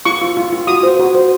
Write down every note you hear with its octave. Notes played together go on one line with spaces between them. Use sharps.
F4 C#6
F4
F4
F4
F#4 D#6
C5
F#4
C5